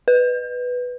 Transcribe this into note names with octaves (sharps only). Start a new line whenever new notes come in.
B4